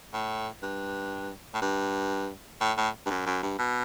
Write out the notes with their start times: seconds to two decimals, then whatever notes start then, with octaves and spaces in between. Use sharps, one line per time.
0.14 A2
0.63 G2
1.54 A2
1.62 G2
2.61 A2
2.77 A2
3.06 G2
3.10 F#2
3.26 F#2
3.43 G2
3.59 B2